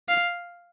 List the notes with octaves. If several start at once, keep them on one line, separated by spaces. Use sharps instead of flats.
F5